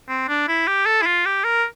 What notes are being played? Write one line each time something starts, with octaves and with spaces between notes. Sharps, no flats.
C4
D4
E4
G4
A4
E4
F4
G4
A#4